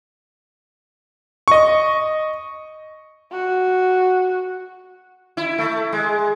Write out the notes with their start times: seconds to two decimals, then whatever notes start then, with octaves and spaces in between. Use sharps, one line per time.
1.48 D#5 C#6
3.32 F#4
5.37 E4
5.58 A3
5.93 G#3